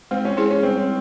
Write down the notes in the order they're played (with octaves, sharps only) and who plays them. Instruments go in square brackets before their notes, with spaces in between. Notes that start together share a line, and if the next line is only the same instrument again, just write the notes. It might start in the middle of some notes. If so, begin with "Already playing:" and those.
[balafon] G#3 [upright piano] C4
[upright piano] C#4
[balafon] E4 G#4 C5
[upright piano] C#4
[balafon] G3 [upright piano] C4